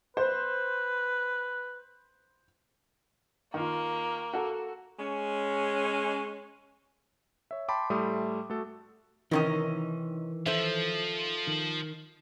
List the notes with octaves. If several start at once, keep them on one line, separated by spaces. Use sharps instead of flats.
B4 C5
D#3 A#3 F4
F#4 A4
G#3 C#4
C#5 E5
G5 A5 B5 C6 D6
A2 G3 A3 C6 D#6
A3 F#4 A4
C3 D#3 E3 C#4 D#5
F3 A4 C5 E5
D#3